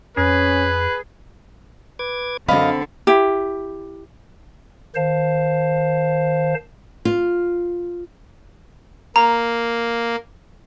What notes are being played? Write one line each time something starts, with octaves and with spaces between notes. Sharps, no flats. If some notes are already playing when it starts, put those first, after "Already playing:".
F2 C#4 G#4 B4
B4 D6 G#6
F#2 D3 C4 D#5 F5 B5
E4 G4
D#3 C5 F5 A5
F4
A#3 A#5